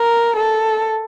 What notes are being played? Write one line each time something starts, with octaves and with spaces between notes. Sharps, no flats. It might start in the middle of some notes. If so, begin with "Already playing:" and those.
Already playing: A#4
A4